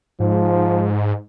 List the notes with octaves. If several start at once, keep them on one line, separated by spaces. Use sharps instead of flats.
G#2 F3